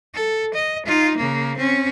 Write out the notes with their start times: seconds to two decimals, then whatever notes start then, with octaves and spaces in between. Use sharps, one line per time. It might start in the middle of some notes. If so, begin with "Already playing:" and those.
0.14 A4
0.54 D#5
0.86 D#4 F4
1.17 C#3 A#3
1.57 C4 C#4